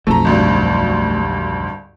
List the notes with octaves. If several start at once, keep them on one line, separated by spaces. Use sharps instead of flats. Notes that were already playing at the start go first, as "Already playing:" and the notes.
B1 F2 A3 A4 A#5
G#1 D2 G2